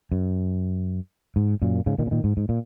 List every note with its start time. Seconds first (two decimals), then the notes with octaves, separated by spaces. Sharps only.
0.12 F#2
1.36 G#2
1.62 F#2 A#2
1.86 G#2 C#3
1.98 A#2 D#3
2.07 C#3
2.11 A#2 D#3
2.24 G#2
2.37 G#2
2.49 A#2